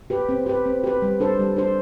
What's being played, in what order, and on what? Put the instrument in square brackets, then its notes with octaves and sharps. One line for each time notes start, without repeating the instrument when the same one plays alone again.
[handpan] G4 B4
C4
G4 B4
C4
G4 B4
G3
D4 A4 C5
G3
D4 A4 C5